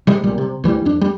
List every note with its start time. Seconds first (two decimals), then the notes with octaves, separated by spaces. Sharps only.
0.07 C3 G3 G#3
0.23 B1 A#2 G3
0.38 C3
0.64 D2 E3 G3
0.85 F2 D4
1.01 G3